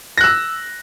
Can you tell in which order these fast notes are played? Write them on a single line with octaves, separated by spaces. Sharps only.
A#6 F#6 E6